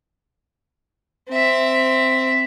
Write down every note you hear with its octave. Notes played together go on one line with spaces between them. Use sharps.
C4 E5